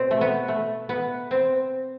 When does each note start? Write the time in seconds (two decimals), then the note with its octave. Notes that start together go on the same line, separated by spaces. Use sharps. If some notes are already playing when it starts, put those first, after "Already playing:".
Already playing: B2 C4
0.11 A3
0.21 B3
0.48 A3
0.89 B3
1.31 C4